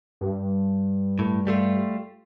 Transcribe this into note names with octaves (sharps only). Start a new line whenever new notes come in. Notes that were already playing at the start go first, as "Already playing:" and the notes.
G2
A2
G3 A3 F4